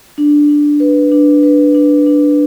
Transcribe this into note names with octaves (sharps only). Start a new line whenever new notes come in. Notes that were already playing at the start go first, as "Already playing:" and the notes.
D4
D4
B4
D4
B4
D4
D4